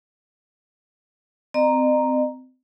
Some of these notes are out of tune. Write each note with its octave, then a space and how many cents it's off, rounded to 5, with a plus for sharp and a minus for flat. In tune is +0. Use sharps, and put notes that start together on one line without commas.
C4 -25 D#5 -45 A#5 +0